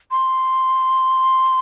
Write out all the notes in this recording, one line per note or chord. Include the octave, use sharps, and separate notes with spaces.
C6